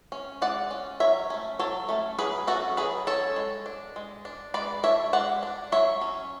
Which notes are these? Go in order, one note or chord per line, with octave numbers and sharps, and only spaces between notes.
C#4
G#3 D5 F#5
C#4
F#3 C#5 E5
A3 C#4
F#3 A4 C#5
A3 C#4
F#3 G#4 B4
C#4 F#4 A4
F#3 G#4 B4
C#4 A4 C#5
G#3
D4
G#3
D4
G#3 B4 D5
D4 C#5 E5
G#3 D5 F#5
D4
F#3 C#5 E5
C#4